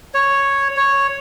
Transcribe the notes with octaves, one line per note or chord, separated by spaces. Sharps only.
C#5
C#5